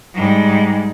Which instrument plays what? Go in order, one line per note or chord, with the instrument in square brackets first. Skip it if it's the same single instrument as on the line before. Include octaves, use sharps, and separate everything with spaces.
[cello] G#2 G3